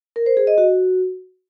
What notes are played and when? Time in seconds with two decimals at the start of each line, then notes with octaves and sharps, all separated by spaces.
0.16 A#4
0.26 C5
0.37 G#4
0.47 D#5
0.58 F#4